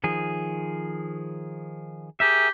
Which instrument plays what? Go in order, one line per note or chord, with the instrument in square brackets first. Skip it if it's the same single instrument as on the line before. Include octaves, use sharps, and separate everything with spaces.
[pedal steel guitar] D#3 F3 G#4
[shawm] G4 [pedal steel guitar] G#4 A#4 E5